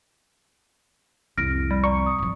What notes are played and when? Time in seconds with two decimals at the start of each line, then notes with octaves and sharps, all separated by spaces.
1.38 C2 F2 F6 A#6 D7
1.71 G3
1.84 D5 A#5 C#6
2.06 D#6
2.18 G#1 F3